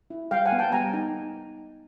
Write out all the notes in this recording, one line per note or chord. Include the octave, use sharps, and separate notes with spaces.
E4
G3 F5 G5
F#5 G#5
B3
G5 A5
G3 G#5 A#5
D#4